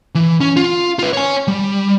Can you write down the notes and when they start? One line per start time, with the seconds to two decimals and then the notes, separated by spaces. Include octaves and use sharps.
0.15 E3
0.41 C#4
0.56 F4
0.99 F4 B4
1.13 C#5 G#5
1.48 G3